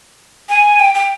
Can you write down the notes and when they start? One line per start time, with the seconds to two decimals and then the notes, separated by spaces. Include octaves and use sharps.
0.49 G#5
0.80 G5
0.95 G5